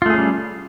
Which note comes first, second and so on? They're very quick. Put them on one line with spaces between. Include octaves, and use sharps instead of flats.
F4 A3 G#4 C#4 G3